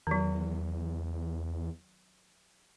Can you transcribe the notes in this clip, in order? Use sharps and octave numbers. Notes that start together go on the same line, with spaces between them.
E2 D#3 F#3